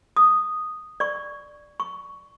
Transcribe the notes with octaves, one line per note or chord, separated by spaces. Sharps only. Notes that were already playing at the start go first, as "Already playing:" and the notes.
D#6
D5 C#6
C#6